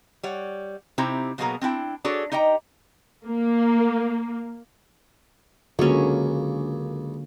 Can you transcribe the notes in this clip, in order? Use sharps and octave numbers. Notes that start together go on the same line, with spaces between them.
G3 C#5 F#5
C3 C4 D#4 E4 G4 A#5
B2 F#3 A#3 B3 G#4 A#5
C4 D4 E4 G5
D4 F#4 G#4 A4 C#5 D5
D#4 G4 D#5 G5 A#5
A#3
C#2 D3 F#3 A#3 C#4